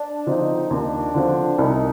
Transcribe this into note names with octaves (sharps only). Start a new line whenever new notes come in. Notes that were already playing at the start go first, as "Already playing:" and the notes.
Already playing: D4
D3 F3 C4 D#4
D#2 D4
D3 F3 C4
C2 D#4